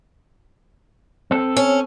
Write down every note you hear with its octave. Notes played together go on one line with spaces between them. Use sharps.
C4 A4
C#4